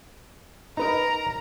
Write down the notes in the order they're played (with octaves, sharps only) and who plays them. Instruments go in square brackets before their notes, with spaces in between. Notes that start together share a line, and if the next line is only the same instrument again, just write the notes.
[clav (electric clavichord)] D#4 B4 D#5 [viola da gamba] A#4 [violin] A#5